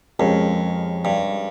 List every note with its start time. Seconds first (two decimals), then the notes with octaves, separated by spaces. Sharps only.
0.19 F2 G#3 C#4 G4 A#4
1.05 G2